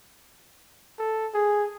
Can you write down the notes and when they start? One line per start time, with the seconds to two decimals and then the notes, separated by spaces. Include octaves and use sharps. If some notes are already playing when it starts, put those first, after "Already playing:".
0.99 A4
1.34 G#4